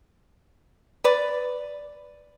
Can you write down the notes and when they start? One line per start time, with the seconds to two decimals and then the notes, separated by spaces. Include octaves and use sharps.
1.04 B4 D5